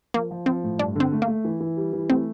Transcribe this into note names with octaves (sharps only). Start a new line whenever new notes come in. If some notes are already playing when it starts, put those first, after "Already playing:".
F3 A#3
F3
F3 C4
A2
G2 D4
D3 C4
A3
A#3
A3
E3
E3
G3
E3
A3 C4